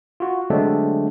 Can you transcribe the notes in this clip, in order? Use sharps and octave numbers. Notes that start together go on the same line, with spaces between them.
F4 F#4
D3 F#3 G#3 A3 C4 D4